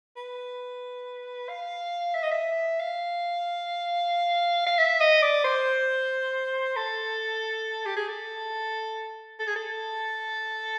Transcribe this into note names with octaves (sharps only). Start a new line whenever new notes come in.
B4
F5
E5
D#5
E5
F5
F5
E5
D#5
D5
C5
A4
G4
G#4
A4
A4
G#4
A4